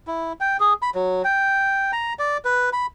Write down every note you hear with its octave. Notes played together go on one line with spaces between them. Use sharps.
E4
G5
G#4
B5
F#3
G5
A#5
D5
B4
B5